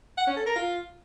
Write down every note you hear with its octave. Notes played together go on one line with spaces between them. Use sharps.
F#5
C#4
A4
A#4
F4